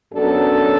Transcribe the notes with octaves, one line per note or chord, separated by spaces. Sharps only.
F#2 F#3 B3 D4 A4